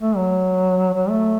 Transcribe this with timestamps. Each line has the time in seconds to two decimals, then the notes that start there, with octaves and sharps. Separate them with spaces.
0.01 A3
0.16 F#3
0.94 F#3
1.09 A3